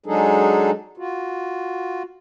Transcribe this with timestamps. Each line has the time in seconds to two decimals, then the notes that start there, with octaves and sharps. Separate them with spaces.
0.06 F#3 G#3 D4 D#4 G#4 A4
0.97 F4 F#4